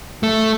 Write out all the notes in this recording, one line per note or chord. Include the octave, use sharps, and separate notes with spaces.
A3